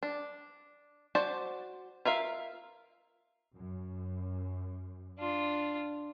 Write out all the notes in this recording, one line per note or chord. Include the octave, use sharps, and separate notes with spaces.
D4
F#4 C5 D5 A5
F4 A#4 E5 F5
F#2
D4 F4